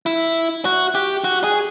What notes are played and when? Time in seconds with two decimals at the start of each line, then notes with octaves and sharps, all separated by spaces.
0.06 E4
0.65 F#4
0.95 G4
1.24 F#4
1.44 G#4